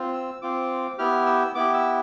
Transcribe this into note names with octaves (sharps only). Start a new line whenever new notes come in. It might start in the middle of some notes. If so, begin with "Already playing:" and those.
Already playing: C4 F4
E6
C4 F4 D6
B3 E4 G4 F6
E6
B3 E4 G4 D6
E6